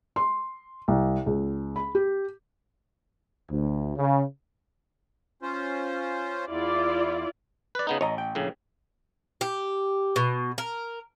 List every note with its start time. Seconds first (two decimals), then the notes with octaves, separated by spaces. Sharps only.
0.16 C6
0.88 C2
1.26 C#2
1.76 B5
1.95 G4
3.51 D2
3.97 C#3
5.42 C#4 F4 C5
6.49 E2 E4 F4 D5
7.75 B4 D5
7.87 C#3 B3 D#4
8.01 A1 C#5 D#5 A#5
8.18 G5
8.35 A#1 A2 C#3
9.41 G4
10.16 B2
10.58 A#4